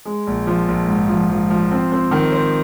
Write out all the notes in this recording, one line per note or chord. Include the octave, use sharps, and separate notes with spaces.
G#3
A#1
F3
A#1
G#2
F3
F3
F3
C4
C4
D#3
C5